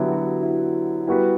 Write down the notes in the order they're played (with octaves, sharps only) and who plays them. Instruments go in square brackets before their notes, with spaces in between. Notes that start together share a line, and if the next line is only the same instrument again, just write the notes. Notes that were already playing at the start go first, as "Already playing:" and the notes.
Already playing: [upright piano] D3 F#3 B3 E4 [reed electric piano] G4
[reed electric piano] F#4
E4
[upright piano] G3 B3 F#4 B4 [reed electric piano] E4